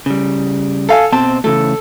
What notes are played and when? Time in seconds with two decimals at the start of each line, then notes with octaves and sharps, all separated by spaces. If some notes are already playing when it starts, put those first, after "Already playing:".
0.06 C#3 G3
0.89 A4 F5 G#5
1.12 B2 C4 C5 A5
1.44 C#3 E3 A3 A4